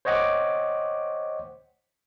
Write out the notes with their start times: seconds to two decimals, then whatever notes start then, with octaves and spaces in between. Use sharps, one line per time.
0.05 C5 C#5 D#5 F#5 G5 D6